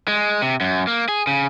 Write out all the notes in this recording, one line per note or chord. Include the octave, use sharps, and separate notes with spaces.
G#3
C3
F#2
A#3
G#4
C#3